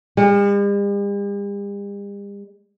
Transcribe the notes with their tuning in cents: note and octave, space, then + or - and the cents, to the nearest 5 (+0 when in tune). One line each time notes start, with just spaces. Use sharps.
G3 +45